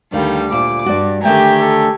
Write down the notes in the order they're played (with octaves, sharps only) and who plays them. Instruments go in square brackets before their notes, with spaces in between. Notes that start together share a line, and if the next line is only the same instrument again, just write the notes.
[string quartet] D2 G3 F5 [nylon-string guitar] D#3
[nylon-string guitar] D2 A#2 [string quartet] D6
[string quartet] G2 [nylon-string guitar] F#4 D5
[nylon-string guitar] D3 D#3 A3 [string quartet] G4 G#5 A#5 [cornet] G5
[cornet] A4